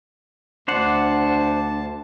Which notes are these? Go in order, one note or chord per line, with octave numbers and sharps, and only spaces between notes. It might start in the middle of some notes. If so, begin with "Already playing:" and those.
D2 D4 C5 F#5 A5